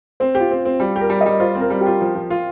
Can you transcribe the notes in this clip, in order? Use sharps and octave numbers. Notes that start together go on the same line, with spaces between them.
C4 C5
F4 G4
C4
C4
G3 G4
G4
A#4
G3
D#5
G3
F4 C5
C4
A#4
G3
G4
F4
F3
F3
F4